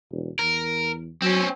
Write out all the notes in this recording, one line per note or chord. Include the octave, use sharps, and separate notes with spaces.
E1
E2 A#4
F#3 C4 C#4